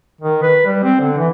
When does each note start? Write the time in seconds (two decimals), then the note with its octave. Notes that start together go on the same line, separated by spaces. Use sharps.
0.21 D#3
0.42 B4
0.66 G3
0.83 C4
1.00 D3
1.17 E3